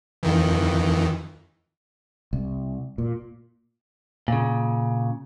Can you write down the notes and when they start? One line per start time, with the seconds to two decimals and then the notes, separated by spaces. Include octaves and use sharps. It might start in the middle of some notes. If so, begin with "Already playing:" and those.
0.23 F2 D#3 E3
2.33 C2
2.98 A#2
4.28 A#2 C#3